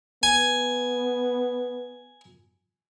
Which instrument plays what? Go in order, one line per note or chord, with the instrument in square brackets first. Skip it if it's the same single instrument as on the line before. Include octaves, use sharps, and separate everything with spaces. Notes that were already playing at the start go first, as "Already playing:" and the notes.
[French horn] B3 [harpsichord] G#5